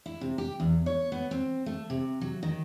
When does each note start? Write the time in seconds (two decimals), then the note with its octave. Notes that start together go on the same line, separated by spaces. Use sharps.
0.06 E4
0.21 C3
0.38 G4
0.60 E2
0.86 C#5
1.12 B3
1.31 C4
1.66 A3
1.90 C3
2.21 F#3
2.43 D#3